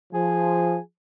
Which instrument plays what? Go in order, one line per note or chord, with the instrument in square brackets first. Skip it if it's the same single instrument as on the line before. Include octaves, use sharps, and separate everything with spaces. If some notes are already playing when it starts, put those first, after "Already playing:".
[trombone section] F3 [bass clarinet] G#4